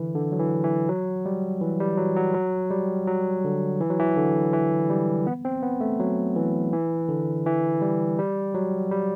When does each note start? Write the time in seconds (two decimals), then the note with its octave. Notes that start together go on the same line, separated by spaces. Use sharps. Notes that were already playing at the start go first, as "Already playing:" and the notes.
Already playing: D3 E3
0.15 D3
0.32 F#3
0.40 E3
0.64 E3
0.89 F#3
1.25 G3
1.61 E3
1.80 G3
1.97 F#3
2.16 F#3
2.34 F#3
2.70 G3
3.07 F#3
3.44 D3
3.81 E3
3.90 F#3
3.99 E3
4.16 D3
4.53 E3
4.90 G3
5.27 B3
5.45 C4
5.62 B3
5.81 A3
6.00 F#3
6.36 E3
6.73 E3
7.09 D3
7.46 E3
7.81 G3
8.19 G3
8.54 F#3
8.91 G3